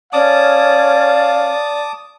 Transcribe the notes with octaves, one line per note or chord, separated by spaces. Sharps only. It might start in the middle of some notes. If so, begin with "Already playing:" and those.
C#4 D5 F5 A5 D6 D#6